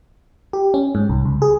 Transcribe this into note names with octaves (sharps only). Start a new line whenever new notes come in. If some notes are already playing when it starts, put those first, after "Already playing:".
G4
C#4
G#2
C2
C#2
G#4